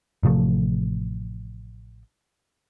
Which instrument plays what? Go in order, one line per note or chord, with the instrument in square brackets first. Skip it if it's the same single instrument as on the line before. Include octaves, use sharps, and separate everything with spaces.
[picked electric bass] A1 C3 F3 A3